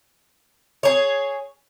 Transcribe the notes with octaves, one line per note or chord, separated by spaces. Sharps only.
G#4 C#5